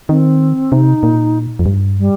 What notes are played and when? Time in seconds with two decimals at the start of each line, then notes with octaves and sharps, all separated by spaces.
0.09 D#3 C4
0.72 C3 D#4
1.03 A#2
1.59 F2
1.66 G2
1.98 G3